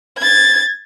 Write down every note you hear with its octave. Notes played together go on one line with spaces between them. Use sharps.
G#6 A6